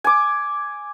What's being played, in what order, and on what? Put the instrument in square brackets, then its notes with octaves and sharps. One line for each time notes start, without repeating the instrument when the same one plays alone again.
[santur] G#5 D6